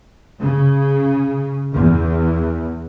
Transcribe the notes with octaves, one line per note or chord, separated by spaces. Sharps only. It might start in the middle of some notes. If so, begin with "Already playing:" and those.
C#3
E2